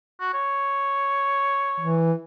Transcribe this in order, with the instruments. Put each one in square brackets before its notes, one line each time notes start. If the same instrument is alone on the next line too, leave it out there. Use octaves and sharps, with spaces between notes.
[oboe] F#4
C#5
[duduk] E3